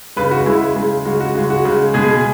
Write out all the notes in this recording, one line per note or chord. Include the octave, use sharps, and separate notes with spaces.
C#3 G#3 B4
F#4
C#3 G#3 E4
C#3 G#3
C#3 G#3 F#4
F#4
C#3 G#3 F#4
F#4
C#3 G#3
B2 G#3 G#4